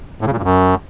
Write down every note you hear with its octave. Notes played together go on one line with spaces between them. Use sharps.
A2
C#3
A#2
G2
F#2